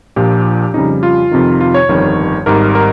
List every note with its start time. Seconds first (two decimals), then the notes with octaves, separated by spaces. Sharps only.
0.16 A#1 A#2 F3 G4
0.74 F2 C#3 G3 D#4
1.03 F4
1.31 F2 C3 D#3
1.60 F4
1.74 C#5
1.89 G1 F2 D#3 G3
2.46 G#1 G#2 G3 A#4
2.75 A#4